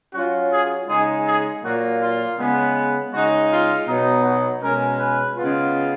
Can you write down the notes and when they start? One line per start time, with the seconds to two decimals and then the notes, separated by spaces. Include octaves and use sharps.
0.14 F#3 C#4 F4 F#4
0.51 G#4
0.88 C#3 G#3 D#4 G#4
1.26 G#4
1.62 A#2 F#3 A#3 F4 F#4
2.00 F4
2.37 C#3 G#3 B3
3.12 C#3 G#3 D#4 F#4
3.50 F4
3.86 B2 F#3 B3 D#4
4.23 F#4
4.61 B2 G#3 C#4 A#4
4.98 B4
5.36 C#3 G#3 B3 F4